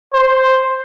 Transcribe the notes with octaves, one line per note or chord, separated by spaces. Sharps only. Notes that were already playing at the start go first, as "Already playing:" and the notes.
C5